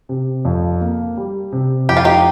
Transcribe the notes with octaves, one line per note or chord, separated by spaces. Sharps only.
C3
F2
A#3
G3
C3
F2 G4
F4
D#4 G4